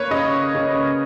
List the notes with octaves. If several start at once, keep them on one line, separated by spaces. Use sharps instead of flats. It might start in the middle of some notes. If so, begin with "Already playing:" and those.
Already playing: A#3 B4 C#5
C#3 D#5
C#3